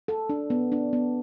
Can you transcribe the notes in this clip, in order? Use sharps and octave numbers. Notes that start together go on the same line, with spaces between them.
A4
D4
B3
D4
B3